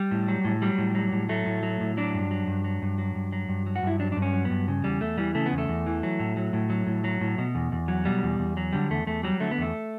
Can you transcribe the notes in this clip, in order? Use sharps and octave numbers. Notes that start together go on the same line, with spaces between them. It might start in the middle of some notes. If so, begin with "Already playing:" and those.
Already playing: G3
A2
F#3
A2
F#3 G3
A2
F#3
A2
F#3 A3
A2
F#3
A2
F#3 D4
G2
F#3
G2
F#3
G2
F#3
G2
F#3
G2
F#3
F#4
G2 E4
F#3 D4
G2 D4
C#4
F#3
B3
G2
C#3
E2 G3
E2 A3
E3 G3
C#3 A3
B3
E2
A3
E2
E3
F#3
A2
F#3
A2
F#3
A2
F#3
A2
B2
E2
E2
F#3
B2 G3
E2
E2
F#3
D3 G3
E2 A3
E2 A3
F#3 G3
D3 A3
B3
E2 A3